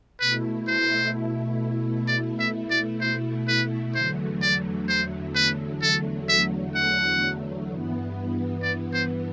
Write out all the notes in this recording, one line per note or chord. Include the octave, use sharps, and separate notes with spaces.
B2 A3 E4 B4
C5
D5
E5
D5
C5
B4
E2 D3 F#3 A3 C5
D5
C5
B4
A4
E5
F#5
G2 E3 B3
D5
C5